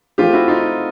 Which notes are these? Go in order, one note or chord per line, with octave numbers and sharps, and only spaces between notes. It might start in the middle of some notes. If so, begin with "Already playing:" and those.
F3 A3 C4 F4 G4
E4 F#4
D#4 F4